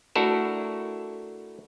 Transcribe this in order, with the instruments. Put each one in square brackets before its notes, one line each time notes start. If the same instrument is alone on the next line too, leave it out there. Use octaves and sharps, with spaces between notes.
[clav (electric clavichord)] A3 D4 E4 F#4 A4 A#4